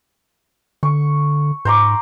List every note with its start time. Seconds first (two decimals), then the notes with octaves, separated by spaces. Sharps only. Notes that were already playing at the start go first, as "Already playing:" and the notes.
0.83 D3 C#6
1.65 G#2 C5 A#5 D6